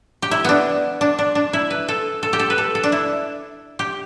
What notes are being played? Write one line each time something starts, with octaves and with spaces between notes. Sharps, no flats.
G4
E4
B3 D4
D4
D4
D4
E4
B4
A4
A4
G4
A4
B4
A4
A4
D4
E4
G4